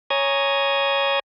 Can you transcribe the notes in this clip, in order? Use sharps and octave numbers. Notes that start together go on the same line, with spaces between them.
C#5 G#5 A#5 D#6 G#6